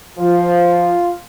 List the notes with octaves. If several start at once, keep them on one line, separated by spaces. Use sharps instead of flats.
F3 F4